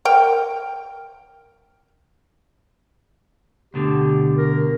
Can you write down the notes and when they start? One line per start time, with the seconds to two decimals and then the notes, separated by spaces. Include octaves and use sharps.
0.05 A#4 G5
3.74 D2 B2 D3 G4
4.37 A#4